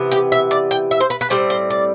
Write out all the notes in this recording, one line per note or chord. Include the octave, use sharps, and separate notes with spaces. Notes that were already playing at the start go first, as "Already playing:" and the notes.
Already playing: C3 E3 B3
G4
E5
D5
G5
E5
C5
B4
B4
A2 G3 C4 C5
C5
D5